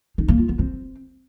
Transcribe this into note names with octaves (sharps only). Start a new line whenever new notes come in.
D#4
A#3
F4
B3
C4